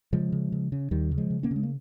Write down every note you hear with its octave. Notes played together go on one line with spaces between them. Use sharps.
C#3 F3 G#3
C#3
C#3
C#3
D#2 D#3 G3
C#3
F3 G#3
C#3
A#3 C#4
C#3 G#3
A#3